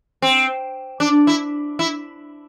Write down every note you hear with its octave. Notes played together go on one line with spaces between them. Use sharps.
C4
D4
E4
E4